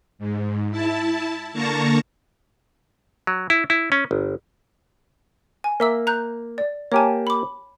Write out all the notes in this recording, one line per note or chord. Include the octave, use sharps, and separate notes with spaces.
G#2
E4 A5
D3 A#3 A5 A#5 C#6
F#3
E4
E4
C#4
G1
G#5
A#3 A#4 E5 E6
A#5 F#6 G6
D5
A#3 G4 C#5 G#5 A5
B5 D6